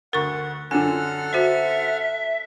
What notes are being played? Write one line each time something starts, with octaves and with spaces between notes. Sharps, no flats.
D2 A#4 F#5 C#6 A6
F#2 D3 F4 A4 F#5 G#5 F6
F#4 C5 E5